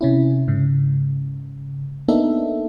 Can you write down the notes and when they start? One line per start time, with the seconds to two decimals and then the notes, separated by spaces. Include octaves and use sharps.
0.01 C3 C#4 E4
0.48 G#2 C#3
2.08 A#3 B3 D4 D#4 A4 E5